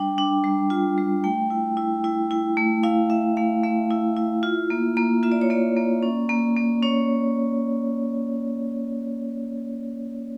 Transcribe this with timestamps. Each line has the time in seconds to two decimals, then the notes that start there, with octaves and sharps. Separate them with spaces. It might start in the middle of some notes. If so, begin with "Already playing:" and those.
Already playing: G3 D4 G5
0.18 D4
0.44 G3
0.70 F4
0.98 G3
1.24 A3 G5
1.50 E4
1.77 E4
2.04 E4
2.31 E4
2.57 A3
2.83 E4 F5
3.10 E4 E5
3.37 A3 F5
3.64 A3 E5
3.91 E4
4.16 E4
4.43 F4
4.70 A#3
4.97 A#3
5.23 F4 E5
5.32 D5
5.41 C#5
5.50 A#3 D5
5.77 A#3
6.03 C#4
6.29 A#3
6.56 A#3
6.83 C#4 C#5